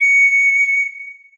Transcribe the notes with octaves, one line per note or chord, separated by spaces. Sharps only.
C#7